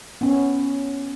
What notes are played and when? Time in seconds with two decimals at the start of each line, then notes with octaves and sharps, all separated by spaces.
0.21 B3 C#4